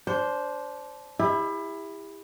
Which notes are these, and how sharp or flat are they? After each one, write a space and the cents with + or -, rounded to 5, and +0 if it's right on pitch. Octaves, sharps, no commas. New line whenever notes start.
D4 -20 C5 +0
E4 +0 G4 +40